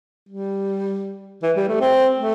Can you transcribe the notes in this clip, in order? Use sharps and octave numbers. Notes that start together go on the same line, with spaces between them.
G3
E3
G3
A3
C4
A3